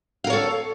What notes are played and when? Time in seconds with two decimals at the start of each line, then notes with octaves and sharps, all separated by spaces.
0.24 F5
0.27 A#4
0.30 C#5
0.33 A4